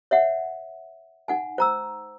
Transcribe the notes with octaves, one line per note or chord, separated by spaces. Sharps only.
C#5 E5 F#5
D#4 F#5 G#5
C5 A#5 E6